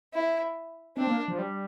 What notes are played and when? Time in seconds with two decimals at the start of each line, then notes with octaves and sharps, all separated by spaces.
0.14 E4
0.97 C4 D4
1.07 A#3
1.28 F3
1.39 G3